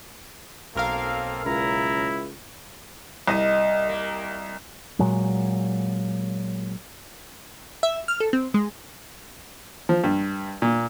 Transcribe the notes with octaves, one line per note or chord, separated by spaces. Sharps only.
B1 A#3 C4 A4 A#4 F5
C#2 C#4 E4 A#5
C2 D#5
A#3
A#2 F#3 G#3
E5
F6
A4
C4
G#3
F3
G2
A#2